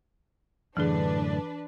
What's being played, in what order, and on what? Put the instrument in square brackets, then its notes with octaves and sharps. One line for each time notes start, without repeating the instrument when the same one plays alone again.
[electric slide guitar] F#2 A2 D3 [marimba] E3 G#4 [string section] D4 B4